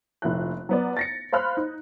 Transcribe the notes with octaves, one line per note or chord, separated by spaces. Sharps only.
F1 A#1 E4 F#6
F#3 B3 D5
A6 A#6 C#7
C5 F5 B5 F6 F#6
D#4